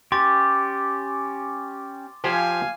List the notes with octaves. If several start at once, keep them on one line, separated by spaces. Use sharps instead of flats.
C#4 G4 C6 D6 A6
F3 G4 C5 F5 G#5